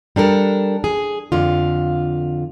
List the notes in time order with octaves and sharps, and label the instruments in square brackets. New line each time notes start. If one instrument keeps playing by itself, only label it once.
[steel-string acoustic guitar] G3 D4 A4 A#4
G#4
F2 D3 F4